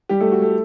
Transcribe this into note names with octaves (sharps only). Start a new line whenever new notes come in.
G3 G4
A3 A4
F#4
A3 A4